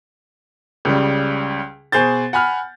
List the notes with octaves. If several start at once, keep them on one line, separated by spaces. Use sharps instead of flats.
C#2 C#3 G3
B2 G#4 C5 G6 A6
F#5 G#5 B5 F6